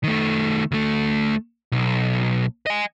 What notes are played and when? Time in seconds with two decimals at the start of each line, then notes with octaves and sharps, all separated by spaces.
0.04 D#3 A3
0.72 D2 A3
1.72 B1
2.66 D#5 G#5